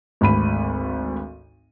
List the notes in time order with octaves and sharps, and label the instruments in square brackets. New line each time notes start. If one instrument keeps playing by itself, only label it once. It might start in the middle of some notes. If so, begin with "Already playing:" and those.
[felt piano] G#1 D2 B5 D#7